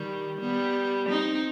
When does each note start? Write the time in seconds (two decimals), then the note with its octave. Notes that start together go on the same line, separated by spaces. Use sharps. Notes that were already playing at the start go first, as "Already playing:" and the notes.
Already playing: D#3 G3
0.41 G3 B3
1.09 C4 D#4